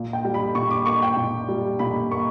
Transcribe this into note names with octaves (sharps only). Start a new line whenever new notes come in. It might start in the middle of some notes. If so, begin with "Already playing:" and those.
Already playing: A#2
G5
G3
B5
A#2 C#6
D6
A#3 C#6
G5
A#2
G3
A#2 B5
A#3 C#6